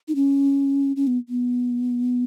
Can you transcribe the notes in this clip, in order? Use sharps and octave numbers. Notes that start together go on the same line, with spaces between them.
D#4
C#4
C#4
B3
B3